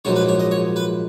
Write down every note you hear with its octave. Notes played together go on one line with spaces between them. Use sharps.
A#1 G#2 F#3 C#5
B4
C#5
D#5
C#5
B4